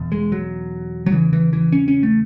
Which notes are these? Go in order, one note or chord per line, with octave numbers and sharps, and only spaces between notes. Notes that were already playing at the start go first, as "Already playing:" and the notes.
Already playing: E2 B2
G#3
F#3
F#3
E2 C#3 E3
E3
E3
C#4
C#4
A3